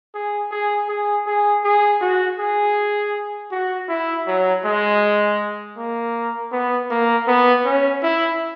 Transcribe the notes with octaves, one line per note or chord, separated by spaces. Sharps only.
G#4
G#4
G#4
G#4
G#4
F#4
G#4
F#4
E4
F#3
G#3
A#3
B3
A#3
B3
C#4
E4